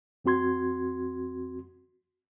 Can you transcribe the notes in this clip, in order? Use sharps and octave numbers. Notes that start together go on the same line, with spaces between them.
F2 C4 F#4 C6 G#6